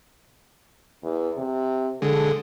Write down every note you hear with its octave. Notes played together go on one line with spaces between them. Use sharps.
E2
C3
D3 G#3 A4